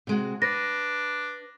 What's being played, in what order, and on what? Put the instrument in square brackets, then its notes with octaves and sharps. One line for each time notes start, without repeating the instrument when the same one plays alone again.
[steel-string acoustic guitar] C3 G#3 F#4
[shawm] D4 [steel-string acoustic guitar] B4 [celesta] A#6